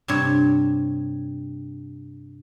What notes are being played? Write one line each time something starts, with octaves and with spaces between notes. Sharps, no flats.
G2 C3 C#5